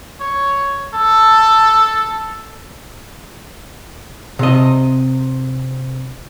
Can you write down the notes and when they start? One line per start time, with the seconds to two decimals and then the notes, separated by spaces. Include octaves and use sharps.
0.20 C#5
0.94 A4
4.39 C3 D#5